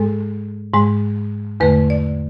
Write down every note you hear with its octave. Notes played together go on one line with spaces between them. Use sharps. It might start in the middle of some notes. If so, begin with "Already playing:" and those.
Already playing: G#2 G#3 A4
G#2 G#3
E2 D3 A3 B4
D5